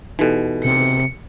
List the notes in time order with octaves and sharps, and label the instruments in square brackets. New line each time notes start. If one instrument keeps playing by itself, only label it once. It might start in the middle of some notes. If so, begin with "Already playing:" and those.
[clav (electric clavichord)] B2 E3 [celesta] D#4 G4 A4
[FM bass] C3 [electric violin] C#7